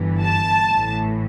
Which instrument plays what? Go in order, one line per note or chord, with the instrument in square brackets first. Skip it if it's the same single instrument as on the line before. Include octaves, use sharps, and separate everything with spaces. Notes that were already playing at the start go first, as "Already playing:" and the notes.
Already playing: [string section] G1 G2 E3
A5
A1 A2 E3